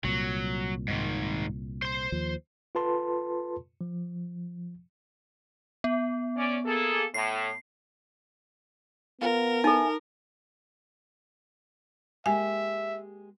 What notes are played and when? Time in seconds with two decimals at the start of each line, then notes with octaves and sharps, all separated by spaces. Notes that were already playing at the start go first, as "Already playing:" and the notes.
0.05 C2 A#2 F#3
0.88 G#2 D#3
1.82 C5 C6
2.12 D#2 F3
2.75 F4 A4 B4 A5 C6
3.81 F3
5.84 B3
6.36 C#4 D5
6.66 A#3 G#4 A4
7.14 A2 C7
9.21 B3 F4 A#4
9.64 D#4 E4 A4 G#5
12.26 G#3 A#3 G4 E5 G#5